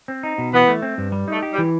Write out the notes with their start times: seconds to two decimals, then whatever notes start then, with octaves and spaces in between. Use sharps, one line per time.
0.08 C4
0.23 D#4
0.38 B2
0.53 E3 B3
0.68 A3
0.82 C4
0.98 G2
1.12 G3
1.28 A3 D#4
1.42 G4
1.53 G3
1.58 E3